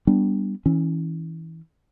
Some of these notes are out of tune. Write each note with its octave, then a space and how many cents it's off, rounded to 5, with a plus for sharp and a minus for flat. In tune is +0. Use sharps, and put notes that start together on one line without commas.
G3 +0 B3 +0 D4 +0
E3 -25 C#4 +0